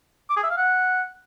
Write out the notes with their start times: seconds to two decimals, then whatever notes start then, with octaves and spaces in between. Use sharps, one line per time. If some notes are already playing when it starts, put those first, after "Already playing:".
0.30 D6
0.36 G#4
0.43 E5
0.50 F5
0.57 F#5